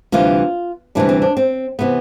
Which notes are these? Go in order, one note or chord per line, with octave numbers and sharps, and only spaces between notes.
D2 C3 E3 G3 F4
D2 C3 E3 G3 D4
C4
D4
C4
C3 E3 B3